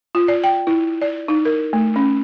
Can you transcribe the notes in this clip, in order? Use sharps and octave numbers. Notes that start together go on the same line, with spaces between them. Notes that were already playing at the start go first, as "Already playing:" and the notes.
F4
D5
G5
E4
D5
D#4
A#4
A3
C#4